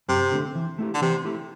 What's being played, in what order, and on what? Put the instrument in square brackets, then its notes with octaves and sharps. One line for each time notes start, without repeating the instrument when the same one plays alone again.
[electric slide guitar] F#2 [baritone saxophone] C3
[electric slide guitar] D3 A3 C4
E3
A3 E4 G4
[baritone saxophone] D3
[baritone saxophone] C3 [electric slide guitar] E3
[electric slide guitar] A3 E4 G4